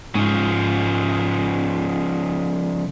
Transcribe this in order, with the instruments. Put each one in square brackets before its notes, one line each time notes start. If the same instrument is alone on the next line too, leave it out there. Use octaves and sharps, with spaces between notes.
[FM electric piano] G#2 [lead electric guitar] C#3 F3